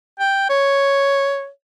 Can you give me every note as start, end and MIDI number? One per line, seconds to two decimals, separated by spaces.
0.19 0.45 79
0.49 1.49 73